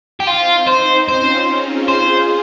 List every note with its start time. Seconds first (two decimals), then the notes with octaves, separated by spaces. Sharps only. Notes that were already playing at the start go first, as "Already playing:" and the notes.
0.20 G4
0.27 C4 D#4 F4
0.67 C5
1.08 C#4 F4 C5
1.48 F4 G#4
1.88 F4 G#4 C5